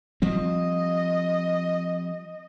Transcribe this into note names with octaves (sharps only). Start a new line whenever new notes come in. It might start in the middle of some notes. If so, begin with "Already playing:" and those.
F3 G3 C4 D#5